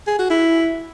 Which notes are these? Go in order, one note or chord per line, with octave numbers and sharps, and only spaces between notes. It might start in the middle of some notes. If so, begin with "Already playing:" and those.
G#4
F#4
E4